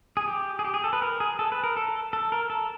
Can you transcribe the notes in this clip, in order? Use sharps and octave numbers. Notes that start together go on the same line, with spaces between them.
G#4
G4
G#4
G4
G#4
A4
B4
A#4
G#4
A4
B4
A#4
A4
A4
A4
A#4
A4